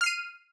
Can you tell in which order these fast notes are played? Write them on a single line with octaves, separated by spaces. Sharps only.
F6 C7 D#7